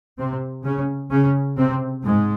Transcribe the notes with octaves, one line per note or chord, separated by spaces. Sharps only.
C3 C4
C#3 C#4
C#3 C#4
C3 C4
G#2 G#3